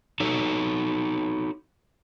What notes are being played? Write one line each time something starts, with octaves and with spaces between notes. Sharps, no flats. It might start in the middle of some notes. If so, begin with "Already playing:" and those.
D#4 F#4 A4 C#5